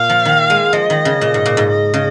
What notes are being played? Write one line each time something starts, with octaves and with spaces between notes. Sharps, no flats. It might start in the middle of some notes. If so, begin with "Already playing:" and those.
Already playing: A#2 F5
F3
D#3
G#3
F3 D#5
D#3
C#3
A#2
G#2
A#2
G#2
D#5
C#3